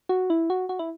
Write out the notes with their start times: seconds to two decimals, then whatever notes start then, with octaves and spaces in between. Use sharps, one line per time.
0.09 F#4
0.30 E4
0.50 F#4
0.69 F#4
0.79 E4